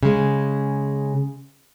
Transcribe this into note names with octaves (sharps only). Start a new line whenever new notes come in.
C#3 G#3